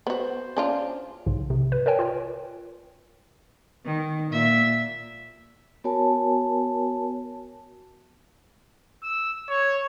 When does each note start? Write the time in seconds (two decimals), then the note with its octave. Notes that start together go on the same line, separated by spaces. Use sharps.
0.07 B3 F#4 C5
0.57 C#4 D4 F4
1.26 B1 G#2 C#3
1.50 C3
1.72 B4
1.86 A#4 B4 C#5 G5 G#5
1.99 F4 B4 C#5
3.85 D#3
4.31 A#2 E5
5.84 B3 F#4 A#4 C#5 G#5 A5
9.03 E6
9.50 C#5